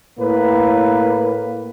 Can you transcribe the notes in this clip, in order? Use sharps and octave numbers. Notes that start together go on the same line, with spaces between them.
A2 A#3 B4